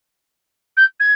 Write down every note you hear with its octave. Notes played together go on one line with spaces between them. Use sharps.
G6
G#6